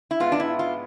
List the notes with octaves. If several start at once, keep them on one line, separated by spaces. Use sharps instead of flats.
E4
G#2 G#3 B3 F4
D4
E4
F4